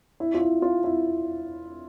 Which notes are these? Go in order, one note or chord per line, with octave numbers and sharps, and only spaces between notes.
E4
F4
E4
F4
E4